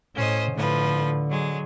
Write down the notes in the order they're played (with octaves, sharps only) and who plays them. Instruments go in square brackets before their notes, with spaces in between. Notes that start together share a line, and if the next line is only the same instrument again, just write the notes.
[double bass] A2 [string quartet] C#4 C5 D#5
[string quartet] A2 F3 B4 [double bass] D3
[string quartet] F#3 G#3